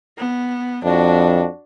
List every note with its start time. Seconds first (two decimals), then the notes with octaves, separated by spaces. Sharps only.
0.17 B3
0.84 F2 D4 F#4